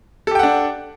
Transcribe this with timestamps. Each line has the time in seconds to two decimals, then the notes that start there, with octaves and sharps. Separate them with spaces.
0.27 A4
0.31 G4
0.35 G5
0.39 F#5
0.43 D4